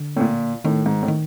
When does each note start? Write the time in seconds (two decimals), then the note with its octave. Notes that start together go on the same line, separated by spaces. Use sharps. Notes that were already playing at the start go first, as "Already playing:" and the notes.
Already playing: D3
0.16 A2
0.20 A#2
0.65 A2 D#3
0.86 G#2
1.03 A2
1.08 D#3